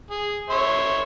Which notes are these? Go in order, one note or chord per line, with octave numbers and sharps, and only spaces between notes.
G#4
C#5 E5 C6